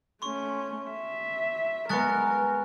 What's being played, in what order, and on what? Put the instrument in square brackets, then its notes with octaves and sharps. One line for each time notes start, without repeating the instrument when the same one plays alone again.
[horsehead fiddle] A3 C#4 [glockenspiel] C6 C#6
[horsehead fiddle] E5
[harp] G#3 B3 [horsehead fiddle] A#4 [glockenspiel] C#6 F#6 A6